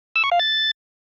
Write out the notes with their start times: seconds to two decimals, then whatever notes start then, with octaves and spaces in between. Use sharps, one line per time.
0.16 E6
0.24 C#6
0.32 F5
0.40 A6